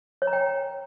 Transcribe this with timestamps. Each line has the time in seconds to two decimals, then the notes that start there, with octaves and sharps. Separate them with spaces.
0.22 C#5
0.27 A#5
0.33 G5